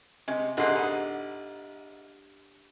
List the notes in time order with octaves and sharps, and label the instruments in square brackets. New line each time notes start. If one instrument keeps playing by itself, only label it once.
[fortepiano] C3 [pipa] G#3
[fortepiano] A1 D3 G#4 [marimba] D4 G4 F#6 [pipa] D#4 C6
[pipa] B3 D#4